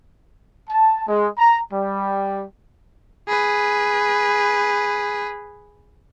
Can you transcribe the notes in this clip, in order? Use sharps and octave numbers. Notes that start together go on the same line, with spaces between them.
A5
G#3
A#5
G3
G#4 B4